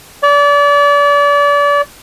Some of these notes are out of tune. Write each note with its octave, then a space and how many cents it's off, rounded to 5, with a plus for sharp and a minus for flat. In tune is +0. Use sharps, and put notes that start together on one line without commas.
D5 -35